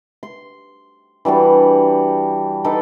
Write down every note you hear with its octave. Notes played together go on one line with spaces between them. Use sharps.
C6
E3 G3 D4 F#4
D4 D#4 A4 B4